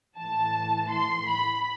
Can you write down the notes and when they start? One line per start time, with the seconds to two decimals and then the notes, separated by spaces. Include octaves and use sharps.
0.17 A2 E3 A5
0.91 C6
1.27 B5